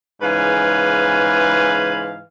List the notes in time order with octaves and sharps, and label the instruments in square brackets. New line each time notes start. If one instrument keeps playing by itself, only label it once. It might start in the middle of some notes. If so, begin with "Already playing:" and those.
[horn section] G#2 C#3 E3 B4 F5 G#5